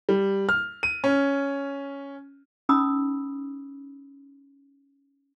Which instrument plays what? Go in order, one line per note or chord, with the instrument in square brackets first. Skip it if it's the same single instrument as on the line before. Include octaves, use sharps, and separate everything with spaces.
[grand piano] G3
F6
D#7
C#4
[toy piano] C#4 D#4 B5 D#6 E6